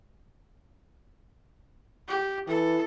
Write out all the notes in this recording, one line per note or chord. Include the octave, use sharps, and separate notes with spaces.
G4
E3 A4